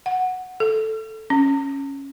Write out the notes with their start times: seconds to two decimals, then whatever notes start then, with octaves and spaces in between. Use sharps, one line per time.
0.06 F#5
0.60 A4
1.30 C#4